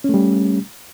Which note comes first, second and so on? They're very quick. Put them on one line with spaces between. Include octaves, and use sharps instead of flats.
C#4 A3 G3